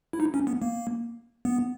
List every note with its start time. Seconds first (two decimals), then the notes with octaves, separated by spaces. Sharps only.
0.13 E4
0.20 D#4
0.34 C#4
0.47 B3
0.62 A#3
1.45 B3